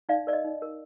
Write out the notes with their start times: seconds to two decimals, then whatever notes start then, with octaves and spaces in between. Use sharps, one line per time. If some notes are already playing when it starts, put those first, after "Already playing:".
0.09 D#4 D5 F5
0.27 A#4 D5
0.33 D#5
0.44 D#4
0.62 A#4